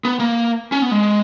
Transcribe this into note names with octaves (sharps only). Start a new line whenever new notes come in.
B3
A#3
C#4
B3
G#3